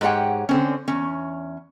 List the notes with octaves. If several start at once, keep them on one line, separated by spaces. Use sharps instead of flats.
G#2 G4 G#4 C#5 F#5 G5
D3 C4 C#4
E2 C#4